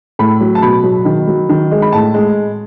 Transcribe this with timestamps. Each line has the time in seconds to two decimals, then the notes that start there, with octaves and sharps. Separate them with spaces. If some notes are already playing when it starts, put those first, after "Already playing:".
0.19 A2 B5
0.41 F#3
0.55 A5
0.62 B2 B5
0.84 F#3
1.05 D#3
1.28 F#3
1.49 D#3
1.71 G#3
1.82 B5
1.92 A2 A5
2.14 G#3